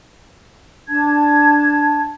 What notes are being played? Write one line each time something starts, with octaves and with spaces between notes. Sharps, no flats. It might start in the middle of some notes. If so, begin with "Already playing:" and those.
D4 A5 G#6